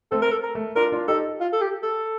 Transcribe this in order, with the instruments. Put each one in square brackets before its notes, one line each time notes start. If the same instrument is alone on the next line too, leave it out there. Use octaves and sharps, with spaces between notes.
[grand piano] A3 C4 [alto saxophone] A4
[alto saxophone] A#4
A4
A#4
[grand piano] A3
[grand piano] D4 F4 [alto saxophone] A#4
[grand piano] D4 F4
[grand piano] D#4 G4 [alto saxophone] A4
[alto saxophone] F4
A4
G4
A4